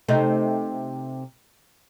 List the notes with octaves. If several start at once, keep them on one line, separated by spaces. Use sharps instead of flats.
C3 A3 D#4